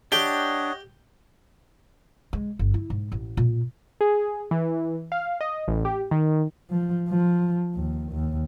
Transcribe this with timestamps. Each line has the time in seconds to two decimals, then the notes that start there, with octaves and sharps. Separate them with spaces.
0.12 D4 G4 C#5 D#5 F#5 G5
2.33 G#3
2.59 G1
2.74 E4
2.90 G#2
3.12 A1
3.37 A#2
4.01 G#4
4.51 E3
5.12 F5
5.41 D#5
5.68 A1
5.85 G4
6.11 D#3
6.70 F3
7.09 F3
7.75 D#2
8.11 D#2